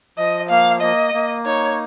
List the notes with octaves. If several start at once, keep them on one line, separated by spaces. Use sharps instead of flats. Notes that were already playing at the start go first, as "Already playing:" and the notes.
F3 D#5
A#3 F5
A#3 D#5
A#3
D#4 C#5